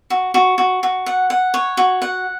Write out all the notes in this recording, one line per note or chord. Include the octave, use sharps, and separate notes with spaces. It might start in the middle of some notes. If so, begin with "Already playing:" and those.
F#4
F#4
F#4
F#4
F#5
F#5
C#5
F#4
F#5